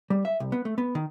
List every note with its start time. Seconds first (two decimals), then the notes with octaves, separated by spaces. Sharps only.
0.10 G3
0.25 E5
0.40 C2
0.52 B3
0.65 A3
0.78 B3
0.95 D#3